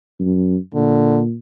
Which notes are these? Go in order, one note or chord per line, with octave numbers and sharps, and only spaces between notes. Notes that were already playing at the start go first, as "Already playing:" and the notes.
F#2
A#2 D3